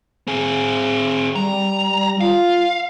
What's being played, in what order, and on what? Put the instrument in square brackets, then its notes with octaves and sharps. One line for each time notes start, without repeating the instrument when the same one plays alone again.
[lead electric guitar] C4 G#4
[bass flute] G3 [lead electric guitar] A#5
[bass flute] F4 [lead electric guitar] F5